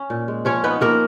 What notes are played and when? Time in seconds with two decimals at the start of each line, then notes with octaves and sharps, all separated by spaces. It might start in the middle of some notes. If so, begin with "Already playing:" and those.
Already playing: C#4
0.10 A#2
0.28 G#3
0.45 F3 C#4 C#5
0.64 B3 D#4 B4
0.81 F3 A#3 A#4